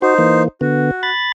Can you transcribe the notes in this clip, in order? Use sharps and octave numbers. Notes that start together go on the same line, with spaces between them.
D#4 F#4 C5
E3 A#3
D3 B3 F#4
B5 A6